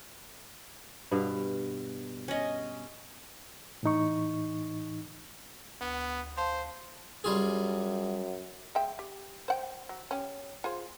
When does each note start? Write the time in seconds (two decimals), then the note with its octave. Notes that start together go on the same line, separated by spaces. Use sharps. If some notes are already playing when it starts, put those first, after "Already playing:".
1.11 G2 B2 F5
2.28 C#4 D#5
3.83 A2 E3 D#4 C#6
5.81 D2 B3
6.37 C5 F5 A5 C6
7.24 F#2 G3 F4 G#4
8.75 G#3 E5 G5
8.99 G4
9.48 C5 F#5 G5
9.89 F#3
10.11 C#4 G4
10.64 F4 G#4 C5